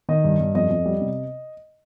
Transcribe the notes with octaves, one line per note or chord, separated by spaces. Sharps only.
D#3 D#5
G2
G2
F2 D#5
F2
G3
C3